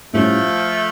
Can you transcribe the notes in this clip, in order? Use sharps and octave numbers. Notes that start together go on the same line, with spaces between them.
A2 F3 G3 A3 C#4